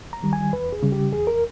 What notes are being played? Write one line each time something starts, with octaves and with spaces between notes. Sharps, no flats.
A#5
D#3 G3
G#5
E2 B4
G#4
C#3 G3
G4
E2 G#4
A#4